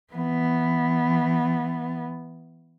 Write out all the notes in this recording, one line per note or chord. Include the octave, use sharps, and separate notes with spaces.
E3 B3